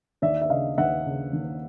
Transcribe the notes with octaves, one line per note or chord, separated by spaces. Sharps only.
D#2 D5 E5
E5
C#3 D#5 F5
D#2 E5 F#5
C#3
D#2